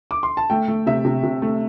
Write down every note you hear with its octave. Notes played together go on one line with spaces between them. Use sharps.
D6
C6
A5
A3 G5
A3
C3 E5
C3
C3
A3